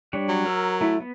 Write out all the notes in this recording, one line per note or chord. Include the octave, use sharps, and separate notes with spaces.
G3 D4 C#5
F#3
A#4 E6
A3 E4
B3